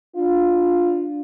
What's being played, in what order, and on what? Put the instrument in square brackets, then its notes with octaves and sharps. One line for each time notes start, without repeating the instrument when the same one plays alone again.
[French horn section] D4 F4